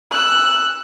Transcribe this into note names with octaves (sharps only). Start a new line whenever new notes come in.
E6 F#6